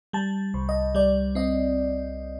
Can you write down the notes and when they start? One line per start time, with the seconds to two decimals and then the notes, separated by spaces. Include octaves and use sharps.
0.13 G3 A5
0.54 C2
0.69 D#5
0.95 G3 D5
1.35 C4 D#5